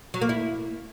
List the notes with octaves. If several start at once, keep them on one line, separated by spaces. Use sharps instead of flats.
F#3
A#3
E4